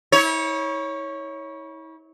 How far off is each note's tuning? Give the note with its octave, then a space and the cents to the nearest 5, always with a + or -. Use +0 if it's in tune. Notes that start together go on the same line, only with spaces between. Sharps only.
E4 -40 C#5 +0